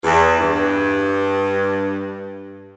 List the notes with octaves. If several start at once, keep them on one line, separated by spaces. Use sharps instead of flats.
E2
G2